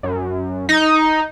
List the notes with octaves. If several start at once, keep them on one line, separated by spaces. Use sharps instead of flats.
F#2
D#4